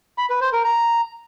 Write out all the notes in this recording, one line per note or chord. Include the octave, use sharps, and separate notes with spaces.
B5
B4
C5
A#4
A#5